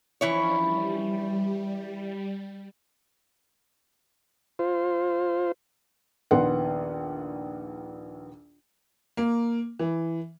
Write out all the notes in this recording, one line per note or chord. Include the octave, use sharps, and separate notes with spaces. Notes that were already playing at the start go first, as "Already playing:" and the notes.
E3 F3 C#4 D4 E4 C#5
G3
F4 C5
A#1 D#2 B3 F#5 C6
A#3
E3